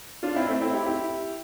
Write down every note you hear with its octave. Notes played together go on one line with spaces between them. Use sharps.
D4 F4
C4 E4
A3 C4
C4 E4
E4 G4
E4 G4